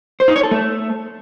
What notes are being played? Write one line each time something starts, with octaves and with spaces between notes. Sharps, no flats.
C5
D#4
C#5
A4
A3